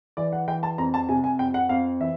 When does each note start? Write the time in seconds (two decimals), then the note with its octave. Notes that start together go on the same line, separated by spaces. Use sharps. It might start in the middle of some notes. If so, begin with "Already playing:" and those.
0.17 E3 D5
0.33 F#5
0.48 E3 G5
0.63 A5
0.78 F2 A#5
0.94 A5
1.09 C3 G#5
1.24 G#5
1.39 F2 G5
1.54 F#5
1.69 F2 F5
2.00 E3 E5